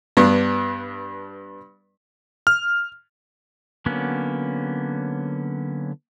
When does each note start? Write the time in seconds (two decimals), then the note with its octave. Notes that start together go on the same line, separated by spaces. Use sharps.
0.17 G2 B3 D4
2.47 F6
3.86 D3 F#3 A#3 B3 C#4